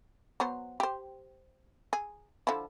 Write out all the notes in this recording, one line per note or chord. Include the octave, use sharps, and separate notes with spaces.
F#3 B3 C5
G4 C5
G#4
D3 F3 E4